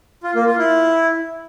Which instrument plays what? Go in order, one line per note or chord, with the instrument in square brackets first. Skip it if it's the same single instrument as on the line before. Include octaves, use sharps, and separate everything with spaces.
[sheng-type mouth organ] F4
A#3
F4
E4